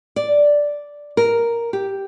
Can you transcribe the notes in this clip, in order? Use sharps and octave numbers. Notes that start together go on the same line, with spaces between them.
D5
A#4
G4